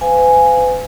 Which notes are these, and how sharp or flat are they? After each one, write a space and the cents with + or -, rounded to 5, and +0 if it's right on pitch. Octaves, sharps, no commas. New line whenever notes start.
B4 +45 F5 +0 G#5 +0